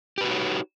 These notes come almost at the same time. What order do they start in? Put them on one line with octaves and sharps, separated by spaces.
G4 B4 F#4 D#4 C#5